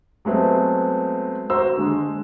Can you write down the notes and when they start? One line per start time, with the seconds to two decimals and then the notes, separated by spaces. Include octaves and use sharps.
0.25 F#3 G#3 A3 B3 C4
1.50 F#4 C5 A#5 E6
1.77 D3 G#3